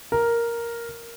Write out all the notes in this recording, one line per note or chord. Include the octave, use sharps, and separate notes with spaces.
A#4